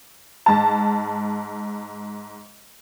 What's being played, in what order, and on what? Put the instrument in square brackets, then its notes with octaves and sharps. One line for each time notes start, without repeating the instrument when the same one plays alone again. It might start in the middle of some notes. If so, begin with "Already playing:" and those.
[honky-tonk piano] G#2 A5